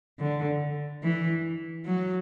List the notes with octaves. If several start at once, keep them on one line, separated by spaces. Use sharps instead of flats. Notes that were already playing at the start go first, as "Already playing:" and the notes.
D3
E3
F#3